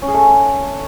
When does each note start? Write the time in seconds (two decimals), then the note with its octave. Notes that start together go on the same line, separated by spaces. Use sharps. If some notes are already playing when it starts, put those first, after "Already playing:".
0.02 C#4
0.08 G#4
0.14 A3